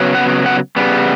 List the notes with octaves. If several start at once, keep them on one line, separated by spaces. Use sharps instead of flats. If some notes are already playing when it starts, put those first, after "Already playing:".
Already playing: C#3 F#3 B3
F#5
F#5
C#3 G3 B3